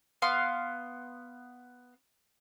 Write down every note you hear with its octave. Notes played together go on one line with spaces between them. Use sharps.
B3 F5 C6 F6